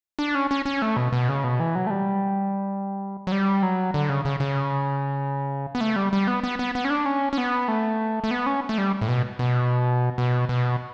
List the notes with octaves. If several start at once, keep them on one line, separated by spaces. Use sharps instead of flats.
D4
C#4
C#4
C#4
A3
B2
B2
C#3
B2
E3
F#3
A3
G3
F#3
G3
F#3
D3
C#3
C#3
C#3
B3
A3
G3
G3
B3
B3
B3
B3
C#4
D4
C#4
C#4
B3
A3
A3
B3
C#4
A3
G3
A2
B2
B2
B2
B2